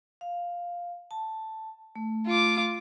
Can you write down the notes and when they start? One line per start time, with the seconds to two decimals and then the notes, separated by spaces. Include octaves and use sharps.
0.21 F5
1.11 A5
1.96 A3
2.27 F4 D6